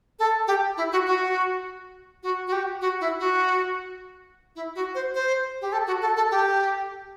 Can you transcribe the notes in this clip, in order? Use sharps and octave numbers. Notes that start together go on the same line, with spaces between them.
A4
G4
E4
F#4
F#4
F#4
F#4
G4
F#4
E4
F#4
E4
F#4
C5
C5
G4
A4
F#4
A4
A4
G4